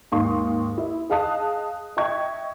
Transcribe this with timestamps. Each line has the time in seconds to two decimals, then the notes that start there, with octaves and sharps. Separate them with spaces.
0.12 D#2 G#2 F5 C6 C#6 D#6
0.78 E4
1.10 G#4 D#5 F5 A5 D#6 F#6
1.97 D#5 E5 G5 C#6 G#6